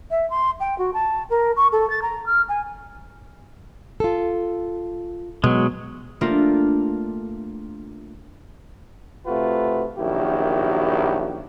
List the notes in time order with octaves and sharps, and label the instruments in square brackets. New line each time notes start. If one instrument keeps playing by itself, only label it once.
[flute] E5
C6
G5
F#4
A5
A#4
C#6
A4
A6
A#5
F6
G#5
[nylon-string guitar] F4 A4
[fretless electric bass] B2 [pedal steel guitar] F#3 G#3
[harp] A3 A#3 D4 F4 G4 A#4
[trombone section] C3 A3 F4 F#4 B4
A#1 F#2 D#3 E4 F#4 G4